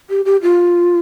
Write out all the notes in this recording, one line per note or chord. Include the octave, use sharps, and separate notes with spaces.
G4
G4
F4